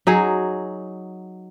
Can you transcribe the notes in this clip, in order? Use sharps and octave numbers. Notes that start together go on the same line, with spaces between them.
F#3 D#4 G#4